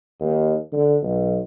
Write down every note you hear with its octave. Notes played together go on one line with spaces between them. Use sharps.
D#2
D3
B1